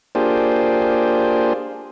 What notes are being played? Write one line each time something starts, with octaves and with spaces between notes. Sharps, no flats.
A#3 D4 F4 G4 G#4 C5